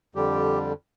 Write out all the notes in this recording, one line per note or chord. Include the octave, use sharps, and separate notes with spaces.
F2 D3 G3 G4